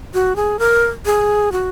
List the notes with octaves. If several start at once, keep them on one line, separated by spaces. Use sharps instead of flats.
F#4
G#4
A#4
G#4
F#4